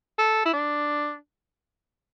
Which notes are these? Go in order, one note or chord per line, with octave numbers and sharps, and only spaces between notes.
A4
E4
D4